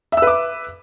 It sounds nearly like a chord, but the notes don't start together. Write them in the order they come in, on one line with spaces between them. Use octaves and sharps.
E5 E6 B4 D6